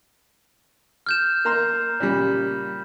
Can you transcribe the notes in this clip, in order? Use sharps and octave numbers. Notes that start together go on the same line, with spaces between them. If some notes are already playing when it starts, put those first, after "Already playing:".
F6 G6 E7
A#3 A#5 C6
A#2 C#3 G3